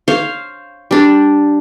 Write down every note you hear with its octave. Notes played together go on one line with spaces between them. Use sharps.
C5 C#5 F5
G3 D4